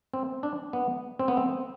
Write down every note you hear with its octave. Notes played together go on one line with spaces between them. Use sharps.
C4
D4
B3
C4
B3
C4